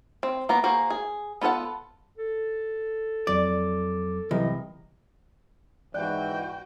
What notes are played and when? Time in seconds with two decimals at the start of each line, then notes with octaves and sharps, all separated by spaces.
0.23 C4
0.49 A#3 B3 A#5
0.64 A#3 F#4 G#4 C5
0.90 G#4
1.41 B3 F4 A4 B4 F#5
2.18 A4
3.27 F2 F#3 D5 D6
4.31 C2 E3 F#3 E4 D#5
5.94 G#2 E3 F#4 D5 G5 F#6